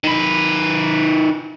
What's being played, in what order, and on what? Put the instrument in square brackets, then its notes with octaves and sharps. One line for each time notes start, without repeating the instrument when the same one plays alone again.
[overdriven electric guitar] D#3 B4